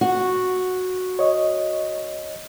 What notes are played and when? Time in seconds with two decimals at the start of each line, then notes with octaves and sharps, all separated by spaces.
0.01 F#4
1.19 C#5 D#5